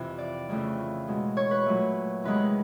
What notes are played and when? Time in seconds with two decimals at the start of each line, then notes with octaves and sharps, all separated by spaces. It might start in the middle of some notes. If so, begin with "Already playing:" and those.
Already playing: F2 C3 E3
0.18 D5
0.49 F2 C#3 E3 A3
1.07 B2 G#3
1.37 C#5
1.51 B4
1.66 A#2 F#3 A3
2.24 E2 C3 D#3 G#3 B4